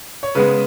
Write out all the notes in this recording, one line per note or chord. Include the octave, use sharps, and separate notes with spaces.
C#5
C#3 G#3 B3 B4